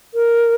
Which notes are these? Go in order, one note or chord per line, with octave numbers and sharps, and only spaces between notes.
A#4